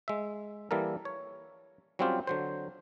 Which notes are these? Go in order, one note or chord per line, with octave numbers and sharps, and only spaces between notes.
G#3 E5
E3 G3 A#3 A4 A#4
C#5
F#3 G3 C4 C#4 F4 G4
D3 F#3 C5